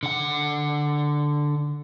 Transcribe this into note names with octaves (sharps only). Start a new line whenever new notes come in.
D3 F#5